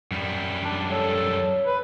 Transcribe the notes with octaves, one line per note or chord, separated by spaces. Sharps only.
F#2 G3
D4
A4 C#5
B4